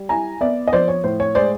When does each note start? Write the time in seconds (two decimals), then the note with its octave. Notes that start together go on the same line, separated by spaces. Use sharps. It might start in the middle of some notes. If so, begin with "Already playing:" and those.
Already playing: G3
0.09 E4 G#5 A#5
0.41 B3 D5 E5
0.67 D#5
0.72 F3 C5 D5
0.88 C#5
1.04 A2 C5
1.20 C#5
1.35 G#3 C5 D5